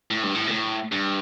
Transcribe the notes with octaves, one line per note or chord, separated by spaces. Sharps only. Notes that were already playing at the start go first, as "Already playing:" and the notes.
A2
G2
A2
B2
A2
G2